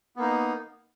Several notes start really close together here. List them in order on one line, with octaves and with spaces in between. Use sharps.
B3 A#3 D#4